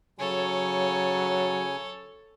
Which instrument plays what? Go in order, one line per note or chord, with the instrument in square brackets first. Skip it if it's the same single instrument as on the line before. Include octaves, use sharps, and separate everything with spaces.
[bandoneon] C#3 G#5 [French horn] F#3 [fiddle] A4 C#5